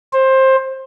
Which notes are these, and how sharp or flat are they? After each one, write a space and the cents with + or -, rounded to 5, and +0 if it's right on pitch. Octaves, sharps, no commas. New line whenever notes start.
C5 +20